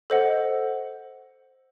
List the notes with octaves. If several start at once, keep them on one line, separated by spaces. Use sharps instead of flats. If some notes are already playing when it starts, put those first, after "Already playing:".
A4 C5 D#5 F#5